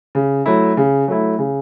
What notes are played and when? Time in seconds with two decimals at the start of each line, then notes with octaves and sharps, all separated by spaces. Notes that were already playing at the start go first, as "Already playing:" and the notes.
0.15 C#3
0.46 F#3 A3 E4
0.77 C#3
1.08 F#3 A3 E4
1.39 C#3